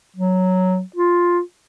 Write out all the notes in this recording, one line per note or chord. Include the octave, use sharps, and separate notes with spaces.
F#3
F4